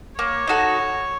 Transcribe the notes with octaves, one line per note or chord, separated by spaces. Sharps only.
A#3 C#5
D#4 F#4 A4